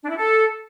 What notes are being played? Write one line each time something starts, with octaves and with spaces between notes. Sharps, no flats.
D4
E4
A4